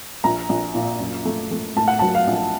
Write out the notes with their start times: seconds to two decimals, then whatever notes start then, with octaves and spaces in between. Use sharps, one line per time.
0.24 A#1 A#5
0.49 A#1
0.75 A#2
1.00 F#2
1.25 A3
1.51 A3
1.76 A2 A5
1.88 F#5
1.99 F#3 A5
2.15 F5
2.27 A#1